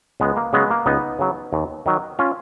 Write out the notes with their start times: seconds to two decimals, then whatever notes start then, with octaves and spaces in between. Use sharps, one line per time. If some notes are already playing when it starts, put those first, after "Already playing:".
0.20 C#2 G#3 B3
0.36 A#3
0.53 C#3 F#3 G#3 B3
0.71 A#3
0.86 C#2 B3 D#4
1.19 C#3 F#3
1.53 D#2
1.86 D#3 F#3
2.19 C#4 F4